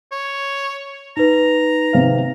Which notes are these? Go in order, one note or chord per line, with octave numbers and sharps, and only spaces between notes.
C#5
D#4 B4 A#5
G#1 C3 F5